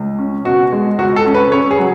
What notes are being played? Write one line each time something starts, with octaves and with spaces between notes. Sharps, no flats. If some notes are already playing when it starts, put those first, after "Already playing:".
Already playing: C#2
C#4
B2 F#4
G#3
C#2 F#4
A4
C#4
B4
C#3 C#5
G#4
F#3